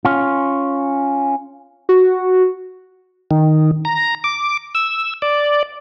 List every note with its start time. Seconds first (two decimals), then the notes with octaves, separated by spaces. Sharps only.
0.05 C#4 F4
1.89 F#4
3.31 D#3
3.85 A#5
4.24 D6
4.75 E6
5.22 D5